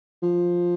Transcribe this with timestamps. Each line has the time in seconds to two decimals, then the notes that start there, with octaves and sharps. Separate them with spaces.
0.22 F3